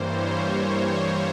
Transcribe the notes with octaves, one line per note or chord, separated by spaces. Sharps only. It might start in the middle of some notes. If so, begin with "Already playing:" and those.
Already playing: G2 E3 G3 A#3 C5 C#5
C#5